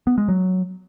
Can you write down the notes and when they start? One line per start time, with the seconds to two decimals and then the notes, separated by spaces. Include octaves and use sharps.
0.07 B3
0.18 G#3
0.28 F#3